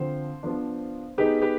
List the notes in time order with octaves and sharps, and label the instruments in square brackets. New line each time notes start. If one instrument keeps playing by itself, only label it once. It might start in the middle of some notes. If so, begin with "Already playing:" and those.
Already playing: [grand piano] D3 F3 C4 [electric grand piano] C5
[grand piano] F3 B3 D4
[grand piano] B3 D#4 G#4 [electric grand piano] G4 B4
[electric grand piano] G4 B4